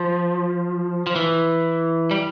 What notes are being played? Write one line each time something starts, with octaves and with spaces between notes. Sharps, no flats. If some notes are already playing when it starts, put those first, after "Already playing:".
Already playing: F3
F3
E3
G3